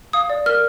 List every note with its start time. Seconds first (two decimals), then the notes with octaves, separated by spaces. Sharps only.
0.13 F5 D#6
0.30 D5
0.46 A#4 F6